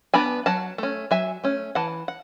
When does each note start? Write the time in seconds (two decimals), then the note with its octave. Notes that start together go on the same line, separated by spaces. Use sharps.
0.14 B3 D4 G#5 B5
0.46 F#3 F#5 A5
0.78 A3 C#4
1.11 F#3 E5 G#5
1.44 A3 C#4
1.75 E3 F#5 A5
2.08 F#5